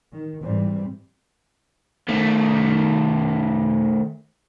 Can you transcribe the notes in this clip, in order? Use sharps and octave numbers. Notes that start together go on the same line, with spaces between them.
D#3
G#2 E3 G3 C4
D#3 A3